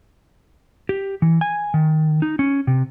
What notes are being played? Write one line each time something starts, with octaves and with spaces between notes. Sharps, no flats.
G4
E3
G#5
D#3
D#4
C#4
C3